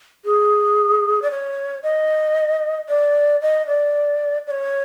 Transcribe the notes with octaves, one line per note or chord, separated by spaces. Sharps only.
G#4
D5
C#5
D#5
D5
D#5
D5
D5
C#5